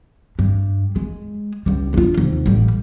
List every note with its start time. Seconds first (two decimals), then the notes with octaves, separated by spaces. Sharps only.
0.39 G2
0.96 G#3
1.66 C#2 G3
1.94 D4 F4
2.17 D#2 C3
2.46 A1 G3